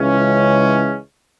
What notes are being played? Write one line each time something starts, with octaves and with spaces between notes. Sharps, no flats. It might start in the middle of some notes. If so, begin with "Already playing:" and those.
Already playing: C#2 C#3 E3 G#3 C#4